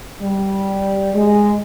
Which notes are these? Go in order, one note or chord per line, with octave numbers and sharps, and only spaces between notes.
G3
G#3